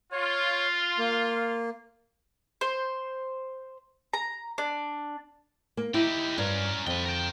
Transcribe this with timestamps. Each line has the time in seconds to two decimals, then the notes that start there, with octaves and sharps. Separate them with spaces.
0.12 F4 C#5
0.98 A#3
2.61 C5
4.14 A#5
4.58 D4
5.77 A#3
5.94 D#4 E4 G4
6.38 G2 C#4 A#4
6.87 F2 B4 G5
7.06 A#4 G5